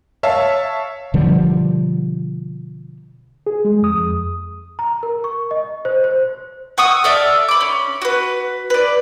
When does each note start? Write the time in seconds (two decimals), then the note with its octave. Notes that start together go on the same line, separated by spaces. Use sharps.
0.23 C#5 E5 F5 A5
1.14 B2 D3 F3 G3
3.47 G#4
3.65 G#3
3.82 F2 D#6
4.79 A#5
5.03 A#4
5.24 C#6
5.51 D#5
5.85 C5
6.04 C5
6.78 F#5 C#6 D#6 E6
7.04 A4 D5 E5 F5
7.49 B5 D6
7.61 C#4
8.02 F#4 B4
8.70 B4 D5